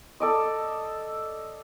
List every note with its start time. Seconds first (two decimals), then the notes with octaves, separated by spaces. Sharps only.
0.20 A4 D5 D#5